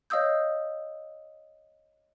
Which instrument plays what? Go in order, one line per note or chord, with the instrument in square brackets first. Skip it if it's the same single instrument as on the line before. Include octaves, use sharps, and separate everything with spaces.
[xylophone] C#5 D#5 F5 D#6 E6 G6